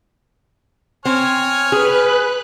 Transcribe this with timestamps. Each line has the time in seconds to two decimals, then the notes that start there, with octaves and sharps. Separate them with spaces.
1.05 C4 C#5 G#5 F6
1.72 G#4 B4 F#6